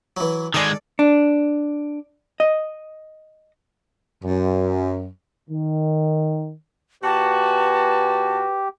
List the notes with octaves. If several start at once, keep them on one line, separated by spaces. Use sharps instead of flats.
E3 F#3
D#3 G#3 A4 D5
D4
D#5
F#2
D#3
A#2 F#4 G4 B4 A5